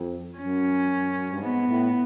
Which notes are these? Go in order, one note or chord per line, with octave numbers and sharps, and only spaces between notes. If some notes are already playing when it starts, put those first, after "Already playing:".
Already playing: F2
F#2 C#4
G2
G#2 B3
A2